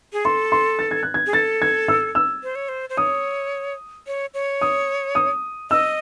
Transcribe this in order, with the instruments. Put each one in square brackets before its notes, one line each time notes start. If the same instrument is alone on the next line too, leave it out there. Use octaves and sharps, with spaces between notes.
[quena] G#4
[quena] A4 [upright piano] C6
[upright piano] C6
A6
G#6
F#6
G#6
[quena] G#4
[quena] A4 [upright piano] A6
[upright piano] G#6
E6
E6
[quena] C5
C#5
C5
C5
[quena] C#5 [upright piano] D#6
[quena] C#5
C#5
[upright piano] D#6
D#6
[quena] D#5 [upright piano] E6